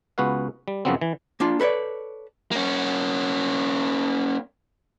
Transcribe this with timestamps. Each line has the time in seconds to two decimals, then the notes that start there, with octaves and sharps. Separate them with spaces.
0.18 C#2 B3 F#4 B4 F5
0.68 G3
0.85 F#2 C#3 F3 F#3 B3 C4
1.01 E3
1.40 A#3 D4 F4
1.60 A4 B4 C#5 D5
2.51 A#3 C#4